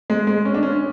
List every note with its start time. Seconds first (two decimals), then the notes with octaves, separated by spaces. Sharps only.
0.10 G#3
0.27 G#3
0.45 C#4
0.54 D4
0.63 C#4